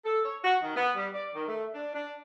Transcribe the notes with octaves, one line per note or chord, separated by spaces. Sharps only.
A4
C#5
F#4
D#3
B3
G3
D5
D#3
A3
D4
D4